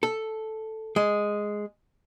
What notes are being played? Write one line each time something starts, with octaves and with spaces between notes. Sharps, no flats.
A4
G#3